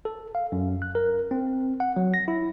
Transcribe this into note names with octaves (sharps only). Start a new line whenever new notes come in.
A4
F5
F#2
F#6
A#4
C4
F#5
F#3
A#6
E4